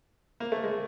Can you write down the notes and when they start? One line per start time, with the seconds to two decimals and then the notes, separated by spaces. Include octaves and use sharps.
0.40 A#3
0.52 A3
0.63 G#3